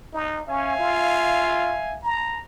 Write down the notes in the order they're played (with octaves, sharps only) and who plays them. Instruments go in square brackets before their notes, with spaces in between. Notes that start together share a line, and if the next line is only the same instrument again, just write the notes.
[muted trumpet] D#4
[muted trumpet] C#4 [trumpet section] E5 F5 G#5
[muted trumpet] F4
A#5